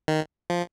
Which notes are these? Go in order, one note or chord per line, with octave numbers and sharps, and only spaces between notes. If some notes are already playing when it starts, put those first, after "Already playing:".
D#3
F3